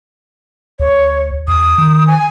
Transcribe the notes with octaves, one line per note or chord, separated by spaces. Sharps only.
D2 C#5
E2 D#6
D#3
G#5